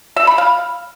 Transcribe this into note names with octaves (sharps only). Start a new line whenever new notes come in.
E5
B5
F5